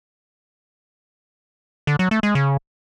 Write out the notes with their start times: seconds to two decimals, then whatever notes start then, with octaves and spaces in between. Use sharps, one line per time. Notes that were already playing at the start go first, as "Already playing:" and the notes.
1.87 D3
1.99 F#3
2.11 A3
2.23 G#3
2.35 C#3